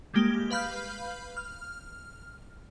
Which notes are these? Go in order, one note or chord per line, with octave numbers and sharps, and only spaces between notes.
G3 G#3 A#3 G4
B4 F5 B5 F6 G6
F6